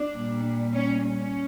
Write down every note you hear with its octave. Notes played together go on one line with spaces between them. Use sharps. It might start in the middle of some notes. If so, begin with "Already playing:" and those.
Already playing: D4
A#2 G3
C#4
C#4